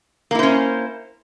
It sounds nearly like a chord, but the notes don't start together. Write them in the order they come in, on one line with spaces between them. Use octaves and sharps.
A#3 E4 C5 C#4